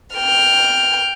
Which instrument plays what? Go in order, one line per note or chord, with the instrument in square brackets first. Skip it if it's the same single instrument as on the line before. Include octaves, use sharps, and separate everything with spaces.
[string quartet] G5 F6